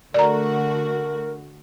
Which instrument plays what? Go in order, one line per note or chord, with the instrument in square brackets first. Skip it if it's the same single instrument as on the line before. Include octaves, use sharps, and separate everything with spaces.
[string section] D3 A3 F#4 [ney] A#4 [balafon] D5 A#5